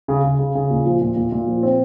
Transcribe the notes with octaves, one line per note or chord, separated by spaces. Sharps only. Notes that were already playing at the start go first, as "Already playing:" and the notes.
C#3
C#3
C#3
C#3
A#2
F3
A#2
A#2
A#2
F3
C4